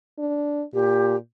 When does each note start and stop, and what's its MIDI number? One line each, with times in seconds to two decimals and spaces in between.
0.19 0.63 62
0.74 1.17 46
0.74 1.16 67